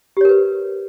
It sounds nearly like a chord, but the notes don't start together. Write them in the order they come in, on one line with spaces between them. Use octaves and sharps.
G4 C#5 A#4 B4